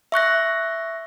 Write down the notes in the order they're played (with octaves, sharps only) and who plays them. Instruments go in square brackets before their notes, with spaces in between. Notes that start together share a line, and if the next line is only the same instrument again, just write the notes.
[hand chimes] E5 C#6 F#6 A#6